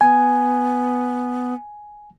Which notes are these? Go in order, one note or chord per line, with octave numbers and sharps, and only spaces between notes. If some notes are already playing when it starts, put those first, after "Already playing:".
B3 G#5